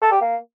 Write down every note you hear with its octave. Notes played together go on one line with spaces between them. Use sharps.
A4
G4
A#3